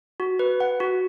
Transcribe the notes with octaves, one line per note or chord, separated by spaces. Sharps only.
F#4
B4
F#5
F#4